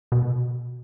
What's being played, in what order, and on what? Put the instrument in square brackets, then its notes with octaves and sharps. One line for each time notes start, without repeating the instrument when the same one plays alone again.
[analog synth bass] B2